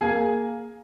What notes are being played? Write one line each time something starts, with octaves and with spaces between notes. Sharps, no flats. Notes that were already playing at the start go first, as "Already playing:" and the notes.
A#3 G#4 G#5